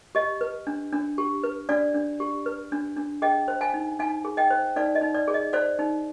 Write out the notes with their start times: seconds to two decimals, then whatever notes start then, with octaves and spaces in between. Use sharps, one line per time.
0.15 G4 D#5
0.41 B4
0.67 D4
0.92 D4
1.18 G4
1.43 B4
1.69 D4 D5 F5
1.94 D4
2.20 G4
2.46 B4
2.72 D4
2.97 D4
3.22 G#4 D#5 G5
3.48 C5
3.61 F5 G#5
3.74 D#4
3.99 D#4 F5 G#5
4.25 G#4
4.37 D#5 G5
4.50 C5
4.76 D#4 D5 F5
4.95 D#5
5.01 D#4
5.15 D5
5.28 G#4
5.34 D#5
5.53 C5 D5 F5
5.79 D#4